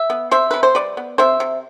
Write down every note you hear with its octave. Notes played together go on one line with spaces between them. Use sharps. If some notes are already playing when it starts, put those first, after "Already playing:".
Already playing: E5
B3
C3 C5 E5
C3 B4
C5
G3 B4 D5
B3
C3 C5 E5
C3